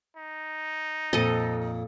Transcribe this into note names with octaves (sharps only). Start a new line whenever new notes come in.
D#4
F2 A#2 A4 D#5